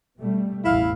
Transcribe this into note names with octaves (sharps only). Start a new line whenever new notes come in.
B2 G3 A3
A1 E2 E4 F5